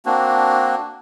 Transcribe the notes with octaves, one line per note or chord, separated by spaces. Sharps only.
A#3 C4 D4 F#4